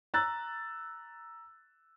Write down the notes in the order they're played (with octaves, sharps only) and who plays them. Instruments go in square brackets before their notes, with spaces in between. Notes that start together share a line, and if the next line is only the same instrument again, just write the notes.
[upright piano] A#5 E6 F#6 A6